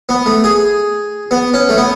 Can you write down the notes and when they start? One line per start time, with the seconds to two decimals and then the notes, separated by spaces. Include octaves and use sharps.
0.09 B3
0.26 A3
0.44 G#4
1.31 B3
1.54 C#4
1.69 A3
1.77 B3